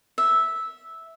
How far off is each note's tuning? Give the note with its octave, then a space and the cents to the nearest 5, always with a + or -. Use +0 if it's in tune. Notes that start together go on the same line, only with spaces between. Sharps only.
E5 -10